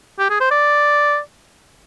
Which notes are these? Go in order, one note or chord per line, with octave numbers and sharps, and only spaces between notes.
G4
G#4
C5
D5